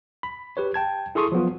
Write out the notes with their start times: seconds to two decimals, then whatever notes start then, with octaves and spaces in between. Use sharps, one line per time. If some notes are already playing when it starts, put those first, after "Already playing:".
0.23 B5
0.57 G4 B4 C#5
0.74 G5 A5 G#6
1.15 E4 G#4 A4 C6 C#6 D#6
1.32 F3 F#3 B3 F4